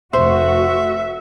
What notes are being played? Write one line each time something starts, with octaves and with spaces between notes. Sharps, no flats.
F1 A3 F#4 C5 E5